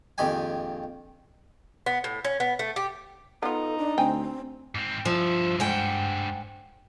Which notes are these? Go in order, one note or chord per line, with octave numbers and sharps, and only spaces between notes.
A#1 F2 D#3 G4 G5 G#5
B3
A2
C#4
B3
A3
G4
B3 D#4 F4 A4
D4
D2 C4 G5 G#5
G#2 C4
G2 F3 E5
G#2 F#5 G5